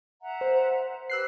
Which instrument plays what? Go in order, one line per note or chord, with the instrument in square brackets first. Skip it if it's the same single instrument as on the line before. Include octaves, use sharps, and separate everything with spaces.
[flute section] E5 F#5 A#5
[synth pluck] C5
[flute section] G4 B4 [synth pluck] E6 F#6 C7